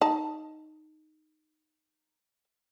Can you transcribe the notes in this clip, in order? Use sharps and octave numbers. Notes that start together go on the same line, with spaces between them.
D#4 A5